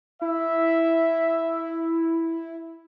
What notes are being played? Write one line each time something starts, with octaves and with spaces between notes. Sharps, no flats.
E4 E5